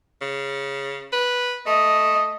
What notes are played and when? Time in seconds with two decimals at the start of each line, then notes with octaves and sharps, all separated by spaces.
0.21 C#3
1.12 B4
1.67 A3 D#5